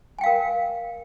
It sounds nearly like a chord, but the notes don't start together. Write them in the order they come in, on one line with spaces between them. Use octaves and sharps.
G#5 G5 F5 A#4